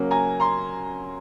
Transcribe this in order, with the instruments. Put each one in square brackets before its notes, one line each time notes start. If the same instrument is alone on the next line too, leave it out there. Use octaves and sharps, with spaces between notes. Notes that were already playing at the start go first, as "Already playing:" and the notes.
Already playing: [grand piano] C#3 F#3 A#3 C#4
[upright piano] G#5 A#5
A#5 C6